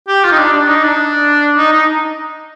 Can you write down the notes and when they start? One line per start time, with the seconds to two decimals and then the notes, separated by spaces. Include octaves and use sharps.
0.08 G4
0.24 F4
0.32 D#4
0.38 D4
0.53 D4
0.68 D#4
0.84 D4
1.57 D#4
1.73 D#4